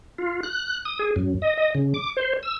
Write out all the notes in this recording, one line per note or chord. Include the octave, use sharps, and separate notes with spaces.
F4
F#6
D#6
G#4
F#2
D#5
D#5
C#3
D6
C5
E6